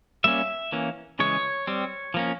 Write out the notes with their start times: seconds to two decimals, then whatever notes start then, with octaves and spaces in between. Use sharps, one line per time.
0.24 G3 A#3 C#4 E5
0.72 E3 A#3 C#4
1.19 C#3 E3 G#3 C#5
1.67 G3 C4
2.14 F3 A#3 C#4